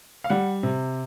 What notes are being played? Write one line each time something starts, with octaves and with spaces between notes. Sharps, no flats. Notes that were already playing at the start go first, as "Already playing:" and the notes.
F5
G3 F#5
C3